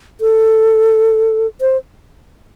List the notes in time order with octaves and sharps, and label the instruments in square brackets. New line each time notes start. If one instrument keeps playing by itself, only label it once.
[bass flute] A4
C5